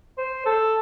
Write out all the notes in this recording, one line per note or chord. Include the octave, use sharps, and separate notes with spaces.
C5
A4